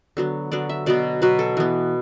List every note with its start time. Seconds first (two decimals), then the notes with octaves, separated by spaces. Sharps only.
0.17 D3 F#3 B3
0.52 D3 F#3 B3 D5
0.69 E5
0.86 B2 F#3 B3 D5
1.22 B2 F#3 B3 B4
1.39 A4
1.57 E3 B3